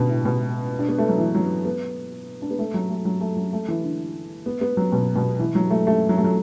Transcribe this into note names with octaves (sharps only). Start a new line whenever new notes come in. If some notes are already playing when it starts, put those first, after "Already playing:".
Already playing: B2 D3
A2
B2
D4
B3
A3
F#3
E3
F#3
B3
D4
B3
A3
F#3
A3
F#3
A3
F#3
A3
E3
D3
B3
B3
F#3
B2
B2
E3
F#3
A3
A3
F#3
A3
F#3